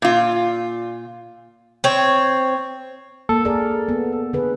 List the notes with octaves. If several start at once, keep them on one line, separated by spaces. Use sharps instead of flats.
A#2 F4
C4 C#5
A#3 A4
G#4 A#4 D5
B3
D3 G#4 B4